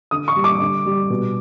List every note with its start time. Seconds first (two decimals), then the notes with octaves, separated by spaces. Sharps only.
0.11 D3 D#6
0.28 C#6
0.36 G3
0.44 D6
0.60 D3
0.86 G3
1.10 B2